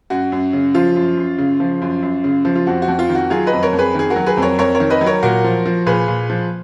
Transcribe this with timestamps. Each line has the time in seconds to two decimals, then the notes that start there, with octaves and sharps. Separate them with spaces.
0.10 F#2 F#4
0.32 F#2
0.53 C#3
0.75 F3 F4
0.96 F#2
1.17 F#2
1.38 C#3
1.60 F3
1.82 F#2
2.03 F#2
2.24 C#3
2.45 F3
2.56 F4
2.67 F2 F#4
2.82 F#4
2.88 F2
2.99 F4
3.09 D#3
3.15 F#4
3.30 F#3 F4 G#4
3.47 B4 D#5
3.52 F2
3.63 A#4 C#5
3.73 F2
3.79 G#4 B4
3.95 D#3 G#4
4.10 F#4 A#4
4.16 F#3
4.26 G#4 B4
4.37 F2
4.42 A#4 C#5
4.58 F2 A#4 C#5
4.75 A#4 C#5
4.80 D#3
4.90 B4 D#5
5.01 F#3
5.06 A#4 C#5
5.23 A#2 F#4 A#4
5.44 F3
5.66 F3
5.86 A#2 G#4 B4
6.08 A#2
6.30 F3